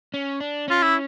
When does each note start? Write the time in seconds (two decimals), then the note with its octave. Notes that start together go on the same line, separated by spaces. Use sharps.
0.14 C#4
0.40 D4
0.68 C#4 F4
0.83 E4